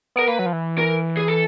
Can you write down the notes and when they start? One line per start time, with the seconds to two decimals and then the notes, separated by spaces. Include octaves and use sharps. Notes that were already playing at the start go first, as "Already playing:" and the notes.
0.16 B3 A#4
0.28 A#3 B4
0.39 F#3
0.46 F3
0.53 E3
0.78 A#4
1.17 G#4
1.28 A4